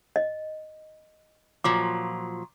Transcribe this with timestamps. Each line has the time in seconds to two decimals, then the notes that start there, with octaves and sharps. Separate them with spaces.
0.16 D#5
1.64 A#2 F3 F#3 D6